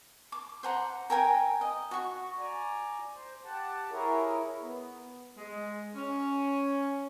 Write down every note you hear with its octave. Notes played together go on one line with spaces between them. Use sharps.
D6
C5 F#5 A#5
A#4 G5 G#5 A#5
D#5
F#4 C#6
D5 G#5 A#5
C5
G4 F#5 A5
E4 G#4 A#4 C#5
B3
G#3
C#4